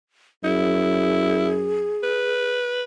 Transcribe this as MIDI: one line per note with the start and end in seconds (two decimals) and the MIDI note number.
0.44 1.96 42
0.44 1.55 64
0.44 2.52 68
2.03 2.83 71